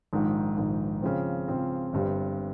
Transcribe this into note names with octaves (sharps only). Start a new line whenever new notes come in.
A#1 G#2 D#3
A#1 G#2 D#3
C#3 F3 C4
C#3 F3 C4
G1 G2 G3 C4